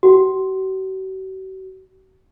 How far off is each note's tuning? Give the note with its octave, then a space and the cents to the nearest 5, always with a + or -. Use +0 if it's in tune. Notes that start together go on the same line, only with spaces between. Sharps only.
F#4 +45